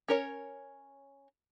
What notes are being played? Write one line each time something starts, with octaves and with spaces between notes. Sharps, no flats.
C#4 A#4 C#5